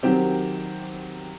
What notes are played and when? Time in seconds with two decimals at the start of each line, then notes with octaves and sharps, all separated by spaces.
0.03 D#3 F#3 C4 G4